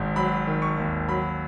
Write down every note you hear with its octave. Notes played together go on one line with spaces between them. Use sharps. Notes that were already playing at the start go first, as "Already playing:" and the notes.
Already playing: G#1 G#2
F#3 B5
D#3
C#6
D#2
F#3 B5